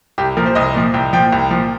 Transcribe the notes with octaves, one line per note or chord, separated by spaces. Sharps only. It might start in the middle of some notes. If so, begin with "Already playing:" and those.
C2 G4
A#2 F3 A#4
C5
C2 D#5
A#2 F3
C2 G5
A#2 F3 G5
C2
A#2 F3